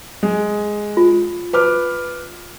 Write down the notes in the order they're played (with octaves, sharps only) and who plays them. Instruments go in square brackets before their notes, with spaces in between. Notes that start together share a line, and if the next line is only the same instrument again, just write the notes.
[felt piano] G#3
[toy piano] F4
[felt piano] B4 D6 F6